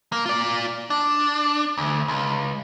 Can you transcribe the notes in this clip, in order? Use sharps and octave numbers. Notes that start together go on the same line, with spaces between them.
A#3
F4 D5
D4
D2
C#2